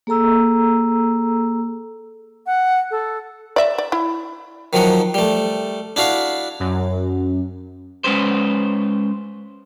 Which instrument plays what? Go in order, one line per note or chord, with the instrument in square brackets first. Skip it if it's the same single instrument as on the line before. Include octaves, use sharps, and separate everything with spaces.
[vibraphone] A#3 G#4 A4 A#5 E6
[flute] F#5
A4
[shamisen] D5 E5
D5
E4
[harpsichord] D#3 F3 F#3 F#5
G3 A3
D4 E4 F#4 F5
[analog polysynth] F#2
[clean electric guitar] G#3 C#4 B4 C5